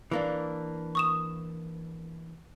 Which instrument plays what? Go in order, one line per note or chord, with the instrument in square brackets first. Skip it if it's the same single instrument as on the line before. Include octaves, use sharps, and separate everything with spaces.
[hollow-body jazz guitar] E3 A#3 D4
[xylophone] C#6 D#6 E7